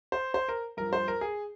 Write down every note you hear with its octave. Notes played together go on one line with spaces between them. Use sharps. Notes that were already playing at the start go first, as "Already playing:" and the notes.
C5
C5
A#4
G2 F3 A#4
C5
A#4
G#4